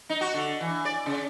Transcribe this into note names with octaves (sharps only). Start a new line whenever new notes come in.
D#4
F#4
D3
E3
D5
C#3